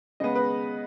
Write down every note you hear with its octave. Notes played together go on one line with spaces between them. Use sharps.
C#3 G#3 B3 D#5
B4